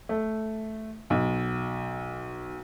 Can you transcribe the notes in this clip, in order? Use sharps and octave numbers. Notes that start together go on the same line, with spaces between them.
A3
B1